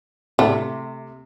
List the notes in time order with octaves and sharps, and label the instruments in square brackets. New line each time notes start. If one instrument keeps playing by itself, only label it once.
[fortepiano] C3 [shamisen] A3